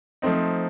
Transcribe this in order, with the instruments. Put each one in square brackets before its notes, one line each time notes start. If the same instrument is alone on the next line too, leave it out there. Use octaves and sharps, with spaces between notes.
[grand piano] F3 A3 C4 D#4